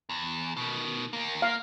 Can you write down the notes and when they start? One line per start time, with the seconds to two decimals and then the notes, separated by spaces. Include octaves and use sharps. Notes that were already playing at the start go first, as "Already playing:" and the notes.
0.09 E2
0.57 B2 D#3
1.13 D#2 A#3
1.42 A#3 F5